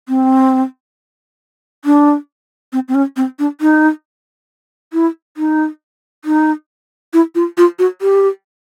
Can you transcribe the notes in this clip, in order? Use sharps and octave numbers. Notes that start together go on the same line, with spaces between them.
C4
D4
C4
C4
C#4
C4
D4
D#4
E4
D#4
D#4
E4
F4
F4
F#4
G4